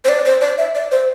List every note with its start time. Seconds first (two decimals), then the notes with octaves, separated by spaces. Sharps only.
0.05 C5
0.09 D5
0.25 C5
0.41 D5
0.58 E5
0.75 D5
0.91 C5